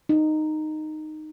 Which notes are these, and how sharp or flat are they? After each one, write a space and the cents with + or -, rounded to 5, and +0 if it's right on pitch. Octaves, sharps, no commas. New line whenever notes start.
D#4 -10